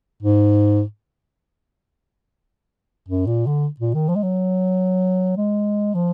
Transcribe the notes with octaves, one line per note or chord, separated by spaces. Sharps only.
G#2
F#2
A#2
D3
A#2
D#3
F3
G#3
F#3
G#3
F3